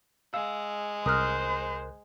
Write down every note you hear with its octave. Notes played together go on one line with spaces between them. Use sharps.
G#3 F5 E6
C2 A#4 C5 D#6 F6 F#6